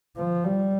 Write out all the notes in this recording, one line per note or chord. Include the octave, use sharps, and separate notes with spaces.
F3
G3